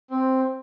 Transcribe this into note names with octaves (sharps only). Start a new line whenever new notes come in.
C4